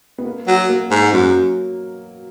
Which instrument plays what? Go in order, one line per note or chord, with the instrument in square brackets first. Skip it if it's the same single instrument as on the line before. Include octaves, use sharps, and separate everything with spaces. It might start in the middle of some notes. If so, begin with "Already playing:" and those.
[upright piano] B3
A#3
[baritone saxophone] F#3
[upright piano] A#3
[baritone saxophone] G#2
[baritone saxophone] F#2 [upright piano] F#3